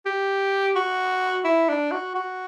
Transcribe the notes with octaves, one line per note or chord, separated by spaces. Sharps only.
G4
F#4
E4
D4
F#4
F#4